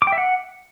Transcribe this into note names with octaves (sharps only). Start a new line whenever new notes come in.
D6
G5
E5
F#5